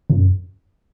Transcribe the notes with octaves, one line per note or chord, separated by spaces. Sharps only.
F#2